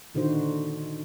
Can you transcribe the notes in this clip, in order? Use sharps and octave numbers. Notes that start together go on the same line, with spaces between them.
A#2 D3 D#3 D#4 F#4 C5